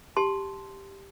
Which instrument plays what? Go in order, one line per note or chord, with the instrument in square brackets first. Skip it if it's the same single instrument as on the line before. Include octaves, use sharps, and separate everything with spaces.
[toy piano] G4 A5 C6